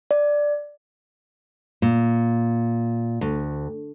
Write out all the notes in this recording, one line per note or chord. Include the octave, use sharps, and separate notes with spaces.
D5
A#2
D2